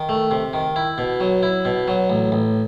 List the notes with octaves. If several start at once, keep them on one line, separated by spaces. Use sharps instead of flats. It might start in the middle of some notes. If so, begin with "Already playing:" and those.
Already playing: D#3
A3
C3
D#3
E4
B2
F#3
E4
B2
F#3
A1
A1